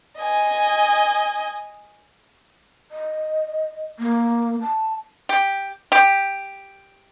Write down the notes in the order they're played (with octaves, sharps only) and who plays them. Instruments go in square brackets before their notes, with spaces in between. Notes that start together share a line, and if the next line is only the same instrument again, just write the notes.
[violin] D#5 G#5
[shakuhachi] D#5
A#3
A5
[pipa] G4
G4